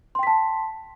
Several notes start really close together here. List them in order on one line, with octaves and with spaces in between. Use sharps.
C6 G5 B6 A5